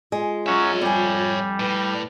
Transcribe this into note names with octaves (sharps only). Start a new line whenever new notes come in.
G#3 F4
F#3 C#4 C#5 E5
F2 G3 G#5
A2 B4